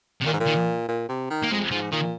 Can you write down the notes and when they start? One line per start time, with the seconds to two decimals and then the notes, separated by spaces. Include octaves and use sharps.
0.22 C3
0.26 A#2 D#3
0.33 G#2
0.40 A#2
0.47 D#3
0.88 A#2
1.09 C3
1.30 D#3
1.43 A#3
1.51 F2 G#3
1.71 G#2 F3
1.92 A#2 D#3